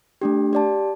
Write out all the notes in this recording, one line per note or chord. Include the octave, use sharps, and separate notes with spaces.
A3 D4 G4
G4 D5 A5